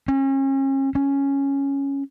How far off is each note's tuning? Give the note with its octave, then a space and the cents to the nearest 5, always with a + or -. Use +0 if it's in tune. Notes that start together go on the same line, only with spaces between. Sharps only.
C#4 -35
C#4 +0